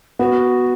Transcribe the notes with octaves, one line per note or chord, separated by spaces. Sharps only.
B3 F#4